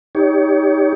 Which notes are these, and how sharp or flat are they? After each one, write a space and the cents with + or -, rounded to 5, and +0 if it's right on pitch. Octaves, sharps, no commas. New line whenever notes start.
D#4 +10 G4 +0 C#5 +30